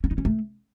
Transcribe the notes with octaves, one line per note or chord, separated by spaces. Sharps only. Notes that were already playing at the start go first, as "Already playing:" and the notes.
C#4
D#4
C#4
A3